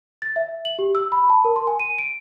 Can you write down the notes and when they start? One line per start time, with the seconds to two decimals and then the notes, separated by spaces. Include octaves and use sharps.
0.22 A6
0.36 E5
0.65 F#7
0.79 G4
0.95 E6
1.12 B5
1.30 A5
1.45 A#4
1.56 C6
1.67 G#5
1.80 D#7
1.98 D7